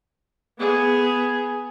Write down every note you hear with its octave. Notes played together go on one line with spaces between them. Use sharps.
B3 G#4